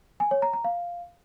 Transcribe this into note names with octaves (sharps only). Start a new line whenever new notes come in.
G#5
C#5
A#5
A#5
F5